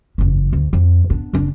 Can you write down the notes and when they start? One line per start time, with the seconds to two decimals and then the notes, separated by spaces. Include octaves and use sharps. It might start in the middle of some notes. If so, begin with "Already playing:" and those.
0.18 F#1 E2
0.53 D2
0.73 F2
1.10 B3 D4
1.33 F#1 D4